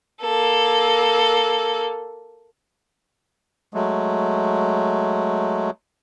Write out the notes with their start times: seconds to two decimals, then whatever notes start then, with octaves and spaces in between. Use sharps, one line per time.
0.22 A#3 A4
3.74 F#3 G#3 A3